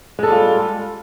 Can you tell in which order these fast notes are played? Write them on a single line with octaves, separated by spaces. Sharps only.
G#3 A4 G3 F4